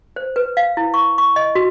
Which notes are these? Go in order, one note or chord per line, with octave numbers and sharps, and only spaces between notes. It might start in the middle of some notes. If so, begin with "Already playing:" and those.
C5
B4
F5
E4
C#6
C#6
D#5
F#4